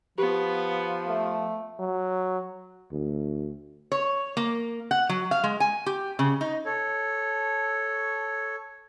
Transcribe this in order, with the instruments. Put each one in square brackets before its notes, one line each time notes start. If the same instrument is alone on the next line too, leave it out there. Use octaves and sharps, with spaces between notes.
[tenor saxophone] F3 [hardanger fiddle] B3 [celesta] G4
[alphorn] A3
[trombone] F#3
[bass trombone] D2
[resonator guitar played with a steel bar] C#5
A#3
F#5
F#3
F5
G#3
G#5
G4
C#3
D#4
[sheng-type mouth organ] A4 C#5